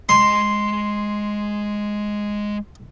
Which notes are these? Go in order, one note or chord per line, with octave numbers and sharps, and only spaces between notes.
G#3 D#5 C6